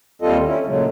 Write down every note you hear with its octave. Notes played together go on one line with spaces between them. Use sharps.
D#2 G3 C4 F4 A4 D#5
C#4 E4
A#2 C#3 F#3 G#3 A3